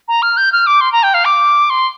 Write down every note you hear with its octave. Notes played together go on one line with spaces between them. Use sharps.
A#5
F6
G6
F6
D6
C6
A#5
G5
F5
D6
C6